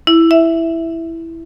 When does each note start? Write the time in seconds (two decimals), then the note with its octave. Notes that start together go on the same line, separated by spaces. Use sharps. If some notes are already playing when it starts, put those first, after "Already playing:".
0.07 E4
0.31 E5